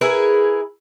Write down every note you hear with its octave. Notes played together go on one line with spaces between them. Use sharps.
E4 G#4 A#4 B4